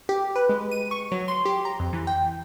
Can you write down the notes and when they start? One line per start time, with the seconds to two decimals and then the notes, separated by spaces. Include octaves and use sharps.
0.09 G4
0.36 B4
0.49 G#3
0.71 D#7
0.91 C#6
1.12 F#3
1.28 C6
1.45 G4
1.65 A#5
1.79 F2
1.93 E3
2.07 G5